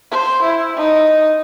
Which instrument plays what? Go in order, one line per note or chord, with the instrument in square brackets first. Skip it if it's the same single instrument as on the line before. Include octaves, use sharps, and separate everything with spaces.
[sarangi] C5
E4
D#4